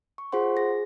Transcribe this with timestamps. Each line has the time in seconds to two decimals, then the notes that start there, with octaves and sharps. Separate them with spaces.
0.18 C#6
0.32 F4 G#4 C5 F#5 C6
0.57 G#4 A#6